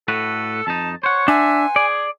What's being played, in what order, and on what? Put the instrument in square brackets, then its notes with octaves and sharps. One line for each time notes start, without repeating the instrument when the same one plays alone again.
[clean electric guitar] A2 F#4 B4 [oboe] A4
[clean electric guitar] F2 D#4 [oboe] A5
[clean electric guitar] C5 F#5 [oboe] C#5
[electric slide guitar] D4 [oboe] E5 [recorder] G#5
[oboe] G#4 [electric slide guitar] D5